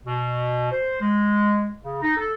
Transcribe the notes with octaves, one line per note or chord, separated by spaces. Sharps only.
B2
C5
G#3
C#3
D#4
A4